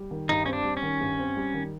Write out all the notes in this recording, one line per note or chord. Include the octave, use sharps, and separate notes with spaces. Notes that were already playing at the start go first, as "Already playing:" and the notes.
Already playing: G3
D#3
G2 D#4
C4 C#4
D4
G3
C#4
D#3
G2
C4
G3
D#3